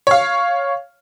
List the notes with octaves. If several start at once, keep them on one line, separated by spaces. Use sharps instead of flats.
C#5 F5